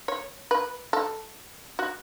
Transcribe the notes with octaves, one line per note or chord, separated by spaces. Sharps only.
C#5
B4
A4
F#4